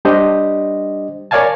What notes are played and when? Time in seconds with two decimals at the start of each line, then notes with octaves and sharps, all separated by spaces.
0.05 G3 D4 G4 C5 D#5
1.31 A#4 C#5 D5 F5 G#5 A5